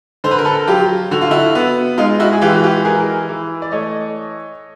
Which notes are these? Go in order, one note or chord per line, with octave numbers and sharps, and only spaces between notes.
D3 C5
B4
A#4
A4 B4
F#3 F4 G4
D3 F#4
F4
E4 F#4
B3
G#3 D#4 F4
E4 F#4
G#4
E3 F4 G4
F#4
F4 G4
E3 G#4 A#4
E3
D5
A3 C#5 D#5